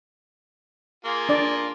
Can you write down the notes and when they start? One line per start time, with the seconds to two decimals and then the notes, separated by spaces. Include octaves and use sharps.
1.05 A#3 F4 G#4
1.29 D4 D5